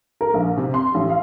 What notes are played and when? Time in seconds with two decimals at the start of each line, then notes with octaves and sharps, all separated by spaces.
0.21 A#4
0.34 A#1
0.57 C3
0.74 C6
0.94 A1
1.10 F5